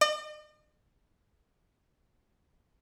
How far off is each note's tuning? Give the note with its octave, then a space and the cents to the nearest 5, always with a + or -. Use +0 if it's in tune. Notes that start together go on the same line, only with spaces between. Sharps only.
D#5 -45